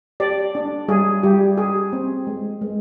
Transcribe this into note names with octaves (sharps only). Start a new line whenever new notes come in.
G4 D5
D4
G3 G#4
G3 G4
G4 G#4
C4
G#3
G#3